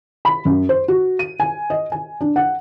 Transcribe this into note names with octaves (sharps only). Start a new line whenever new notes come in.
B5
F#2
C5
F#4
D#7
G#5
D#5
G#5
D4
F#5